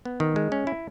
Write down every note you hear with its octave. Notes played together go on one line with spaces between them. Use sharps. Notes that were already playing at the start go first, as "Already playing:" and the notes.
B3
D#3
G#3
C#4
E4